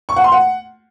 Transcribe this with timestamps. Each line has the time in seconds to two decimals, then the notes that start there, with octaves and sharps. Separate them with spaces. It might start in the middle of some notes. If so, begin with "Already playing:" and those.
0.09 C#6
0.16 F#5
0.24 C6
0.32 F#5